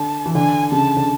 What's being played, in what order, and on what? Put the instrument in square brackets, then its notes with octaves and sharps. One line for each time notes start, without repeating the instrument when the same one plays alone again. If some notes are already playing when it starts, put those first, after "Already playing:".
Already playing: [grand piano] D3 [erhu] A5
[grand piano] E3
[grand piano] D3 [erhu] G#5
[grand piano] C#3 [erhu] A5
[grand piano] D3